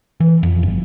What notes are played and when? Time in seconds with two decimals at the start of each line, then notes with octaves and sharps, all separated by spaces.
0.20 E3
0.43 F2
0.63 G1